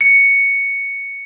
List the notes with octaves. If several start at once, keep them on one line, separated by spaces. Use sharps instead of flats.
C#7